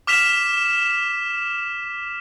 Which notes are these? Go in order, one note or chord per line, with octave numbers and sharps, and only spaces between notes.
D6 F6 B6 E7 F7